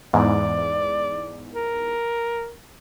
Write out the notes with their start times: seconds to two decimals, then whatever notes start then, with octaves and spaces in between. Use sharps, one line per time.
0.13 E2 G#2 D5
1.53 A#4